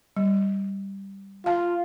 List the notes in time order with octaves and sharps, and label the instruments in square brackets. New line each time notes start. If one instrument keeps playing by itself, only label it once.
[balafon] G3
[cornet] F4 [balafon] F5 A5